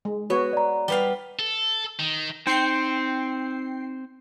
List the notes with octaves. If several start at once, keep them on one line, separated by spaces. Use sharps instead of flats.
G#3
B3 F#4 C#5
D5 A#5
G3 B3 F5 G7
A4
D#3
C4 D#4 G5 C6 C7 C#7